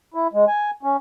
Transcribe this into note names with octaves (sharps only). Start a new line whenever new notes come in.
E4
G#3
G#5
C#4